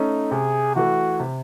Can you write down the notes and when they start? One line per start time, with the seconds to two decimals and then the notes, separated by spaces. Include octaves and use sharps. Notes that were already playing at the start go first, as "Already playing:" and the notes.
Already playing: A3 C#4 D#4
0.31 C3 G#4
0.75 E3 A3 F#4
1.20 C3